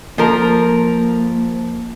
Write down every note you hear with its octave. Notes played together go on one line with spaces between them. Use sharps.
F3 A#3 A#4